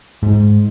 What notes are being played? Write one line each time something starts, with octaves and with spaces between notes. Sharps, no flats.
G#2